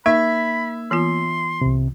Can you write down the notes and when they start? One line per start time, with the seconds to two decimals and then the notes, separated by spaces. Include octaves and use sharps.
0.06 A#3 D#4 E5 B5 G#6
0.91 E3 B3 F4 C6
1.61 C2 C3